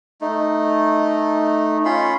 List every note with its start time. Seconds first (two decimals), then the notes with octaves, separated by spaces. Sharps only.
0.21 A3 D#4
1.85 C#4 F4 B5 C6